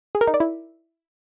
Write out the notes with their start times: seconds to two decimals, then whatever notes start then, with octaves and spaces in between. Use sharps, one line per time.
0.15 G#4
0.21 A#4
0.27 D#4
0.34 D5
0.40 E4